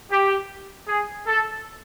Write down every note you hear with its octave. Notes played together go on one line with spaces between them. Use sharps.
G4
G#4
A4